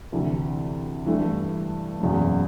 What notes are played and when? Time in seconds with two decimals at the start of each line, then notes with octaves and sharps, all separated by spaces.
0.12 D2 C3 E3
1.06 G2 E3 A3
2.00 F#1 E2 B2